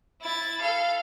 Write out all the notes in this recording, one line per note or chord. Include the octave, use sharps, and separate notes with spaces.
E4 A6
A4 F5